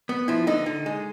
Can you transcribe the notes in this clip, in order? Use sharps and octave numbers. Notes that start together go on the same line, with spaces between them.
B3
F3 E4
D3 D#4
D3
G#3